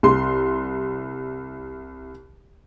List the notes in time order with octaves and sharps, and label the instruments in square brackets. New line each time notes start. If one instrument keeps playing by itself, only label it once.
[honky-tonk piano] C2 C6